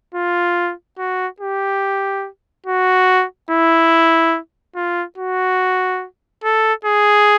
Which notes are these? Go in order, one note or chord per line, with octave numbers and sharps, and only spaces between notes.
F4
F#4
G4
F#4
E4
F4
F#4
A4
G#4